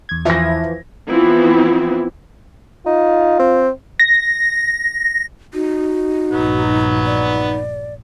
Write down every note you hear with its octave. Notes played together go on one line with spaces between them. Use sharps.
E2 G#6
E3 F3 E5 A#6
E3 F3 B3 C4 E4
D#4 F4
C4
A#6
D#4 F#4
A#1 G2 F#3 B3
D5